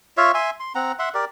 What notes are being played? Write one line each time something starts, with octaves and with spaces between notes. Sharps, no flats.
F4 C#5 E5 F5
E5 G#5 C6
C6
C4 F#5 A#5
E5 F#5 C6
G4 A#4 D5